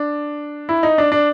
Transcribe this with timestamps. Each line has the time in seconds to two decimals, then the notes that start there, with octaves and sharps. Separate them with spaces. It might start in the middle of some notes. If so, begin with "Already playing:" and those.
Already playing: D4
0.69 E4
0.83 D#4
0.98 D4
1.12 D4